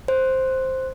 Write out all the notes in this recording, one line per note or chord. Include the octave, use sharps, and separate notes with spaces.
C5